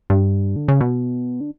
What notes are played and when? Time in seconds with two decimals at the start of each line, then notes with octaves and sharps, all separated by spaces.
0.10 G2
0.56 D3
0.68 C#3
0.81 B2
1.41 D3